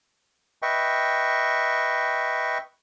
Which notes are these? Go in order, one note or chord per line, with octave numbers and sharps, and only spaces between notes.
B4 D#5 E5 G5 C#6